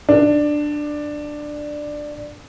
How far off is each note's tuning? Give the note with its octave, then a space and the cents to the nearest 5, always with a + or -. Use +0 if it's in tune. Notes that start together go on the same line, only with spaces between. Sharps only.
D4 +10